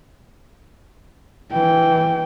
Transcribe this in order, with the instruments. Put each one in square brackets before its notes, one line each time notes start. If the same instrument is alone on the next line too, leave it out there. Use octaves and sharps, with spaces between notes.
[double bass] E3 [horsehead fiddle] G5